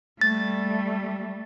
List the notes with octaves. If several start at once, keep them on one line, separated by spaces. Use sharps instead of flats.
G3 A3 A6